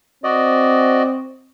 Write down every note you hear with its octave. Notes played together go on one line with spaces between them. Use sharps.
C4 F#4 D5 D#5